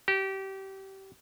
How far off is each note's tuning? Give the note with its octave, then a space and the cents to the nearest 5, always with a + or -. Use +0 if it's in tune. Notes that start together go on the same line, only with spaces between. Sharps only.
G4 -25